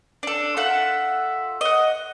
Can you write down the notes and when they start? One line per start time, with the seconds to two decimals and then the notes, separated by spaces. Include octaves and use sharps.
0.23 D4 A4
0.57 F4 A4 E5 F#5
1.61 D#5 F#5